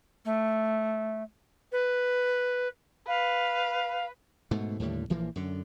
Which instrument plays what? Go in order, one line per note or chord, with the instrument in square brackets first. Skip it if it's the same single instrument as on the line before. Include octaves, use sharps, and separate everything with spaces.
[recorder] A3
B4
[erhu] B4 [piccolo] F5
[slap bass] G#2 B2 A3
D#2 A2 D3 G3
A#1 E3 F3 A#3
F#2 D3